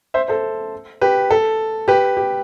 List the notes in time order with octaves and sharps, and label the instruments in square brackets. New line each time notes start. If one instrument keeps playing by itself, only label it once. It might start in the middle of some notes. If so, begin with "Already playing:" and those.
[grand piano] C5 E5
A4 C5
G4 B4
A4
G4 B4
G4